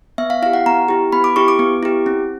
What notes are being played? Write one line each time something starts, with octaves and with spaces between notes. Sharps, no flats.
B3 E5
F5
E4 G4 F5
F#5
B3 A#5
E4 G4
B3 B5
D6
E4 G4 C#6
D6
B3
E4 G4
C4